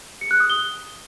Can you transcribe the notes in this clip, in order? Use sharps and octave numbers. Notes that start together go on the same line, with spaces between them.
C#7
F#6
D#6
G7